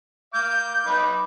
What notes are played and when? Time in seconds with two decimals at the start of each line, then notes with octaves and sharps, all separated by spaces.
0.34 F5 D6 G6
0.86 D#4 B4 D6